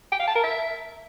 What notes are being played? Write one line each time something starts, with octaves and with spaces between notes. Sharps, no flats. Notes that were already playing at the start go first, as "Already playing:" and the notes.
G5
F5
A5
A#4
E5